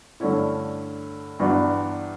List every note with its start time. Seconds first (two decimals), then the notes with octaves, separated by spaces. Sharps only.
0.20 G2 D3 A3 C#4 E4
1.39 G1 G2 E3 B3 D4